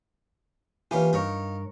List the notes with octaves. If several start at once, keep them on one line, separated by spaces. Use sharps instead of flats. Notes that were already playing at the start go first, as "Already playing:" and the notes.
E3 A#3 C#4 F4 G4 G#5
G2 D#4 F4 A#4 C#5